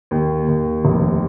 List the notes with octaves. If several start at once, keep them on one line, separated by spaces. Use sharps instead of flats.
D#2
D#2
F1